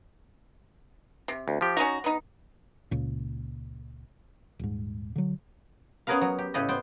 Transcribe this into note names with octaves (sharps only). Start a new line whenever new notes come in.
C3
D2
F3 G4
C#4 D#4 F#4 A#5
B3 D#4
C#2 A#2
D#1 G#2
D3 F#3
B3 C#4 G#4 A#4 B4 F5
F#3
G4
A2 C#3 G4 A4 B4 D#5
B3 C5 G5